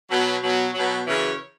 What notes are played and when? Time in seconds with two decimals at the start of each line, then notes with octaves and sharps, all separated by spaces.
0.11 B2 F#3
0.42 B2 F#3
0.75 B2 F#3
1.07 F#2 C#3 E3 C#5